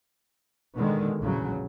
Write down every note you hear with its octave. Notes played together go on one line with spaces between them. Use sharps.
B2 D3 D#3 G#3
A#1 E2 C#3 F#3